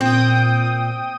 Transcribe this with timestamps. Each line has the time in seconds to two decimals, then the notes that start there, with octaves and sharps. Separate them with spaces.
0.01 A#2 C4 G5 D#6